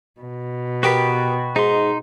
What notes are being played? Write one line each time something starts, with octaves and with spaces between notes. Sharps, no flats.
B2
B3 F#4 G4 A#4 G5 B5
G#2 D#4 C6